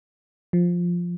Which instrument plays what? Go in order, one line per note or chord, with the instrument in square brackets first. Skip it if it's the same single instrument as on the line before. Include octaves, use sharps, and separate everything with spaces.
[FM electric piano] F3